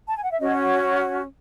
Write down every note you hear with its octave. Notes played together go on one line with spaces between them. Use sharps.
A5
G#5
F#5
E5
C#4 F#4 C#5 D#5